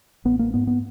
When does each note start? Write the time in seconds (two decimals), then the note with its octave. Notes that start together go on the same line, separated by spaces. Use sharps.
0.25 A1 B3
0.39 A#3
0.54 G#2 B3
0.67 B3